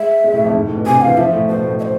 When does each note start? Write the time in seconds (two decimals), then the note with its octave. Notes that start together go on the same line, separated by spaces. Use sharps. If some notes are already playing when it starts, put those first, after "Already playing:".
Already playing: G#3 E5
0.24 G#3
0.34 A2
0.44 F2
0.54 G#2
0.65 A2
0.76 B2
0.86 C3 G#5
0.96 D3
1.01 E3 F5
1.17 F3 E5
1.33 A2
1.48 B2 C5
1.64 A2
1.79 E5
1.82 C5